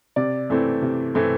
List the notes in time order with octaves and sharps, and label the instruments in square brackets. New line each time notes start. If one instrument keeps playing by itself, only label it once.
[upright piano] C3 D5
E3 A3 C4
C3
E3 A3 C4